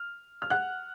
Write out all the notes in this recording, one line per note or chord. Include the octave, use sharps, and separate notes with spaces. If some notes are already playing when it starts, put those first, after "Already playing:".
Already playing: F6
F6
F#5 F#6